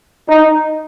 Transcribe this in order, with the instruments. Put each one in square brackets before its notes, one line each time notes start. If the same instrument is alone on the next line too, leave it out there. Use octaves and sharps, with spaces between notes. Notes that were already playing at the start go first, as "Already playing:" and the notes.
[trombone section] D#4